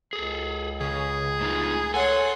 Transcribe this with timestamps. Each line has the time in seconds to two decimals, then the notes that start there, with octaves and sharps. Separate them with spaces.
0.13 C#2 G#4 A4
0.81 C#3 G#4
1.41 A2 D#4 F4
1.94 G#4 A4 C#5 F#5 G#5 C6